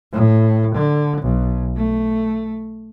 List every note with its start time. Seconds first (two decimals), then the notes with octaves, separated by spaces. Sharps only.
0.12 A2
0.75 D3
1.22 B1
1.77 A3